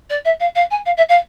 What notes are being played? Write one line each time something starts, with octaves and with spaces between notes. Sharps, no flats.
D5
E5
F5
F5
G#5
F5
E5
F5